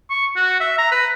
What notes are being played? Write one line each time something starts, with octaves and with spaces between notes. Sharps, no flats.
C#6
F#4
E5
A#5
B4